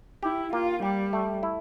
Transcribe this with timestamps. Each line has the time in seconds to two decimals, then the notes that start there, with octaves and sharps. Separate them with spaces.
0.23 E4 G4
0.53 A#3 F4
0.83 G3 G4
1.13 A3
1.43 E4